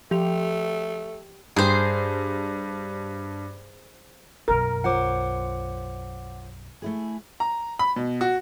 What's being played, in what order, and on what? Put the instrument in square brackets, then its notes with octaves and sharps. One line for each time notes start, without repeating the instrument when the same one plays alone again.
[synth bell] F3 F7 [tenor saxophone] A3 [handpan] G4
[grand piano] G2 [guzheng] G#4 C5
[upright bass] B1 F#2 [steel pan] A#4
[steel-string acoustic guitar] F4 C5 C#5 [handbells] F#5 D6
[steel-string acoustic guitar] A3 E4 G#4
[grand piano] A#5
B5
B2
F#4